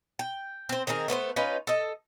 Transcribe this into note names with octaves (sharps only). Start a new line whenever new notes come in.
G5
C4 C5
D#3 C4 G#4 A#4
A3 B3 B4 C5
C#4 D#4 F4 B4
A4 D#5